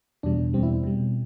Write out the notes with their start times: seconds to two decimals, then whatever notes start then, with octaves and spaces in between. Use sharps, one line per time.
0.23 E2 B2 G3 D4
0.53 E2 B2 G3 C4
0.63 E4
0.84 B2 G3